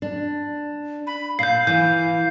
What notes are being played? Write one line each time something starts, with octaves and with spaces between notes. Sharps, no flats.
D4
B5
A#2 F5 G6 C7
E3 G6